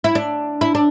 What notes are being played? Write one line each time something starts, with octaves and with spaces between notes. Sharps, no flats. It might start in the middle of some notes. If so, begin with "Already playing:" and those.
E4
D4
E4
D4